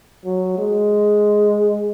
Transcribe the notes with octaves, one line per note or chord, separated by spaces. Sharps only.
F#3
G#3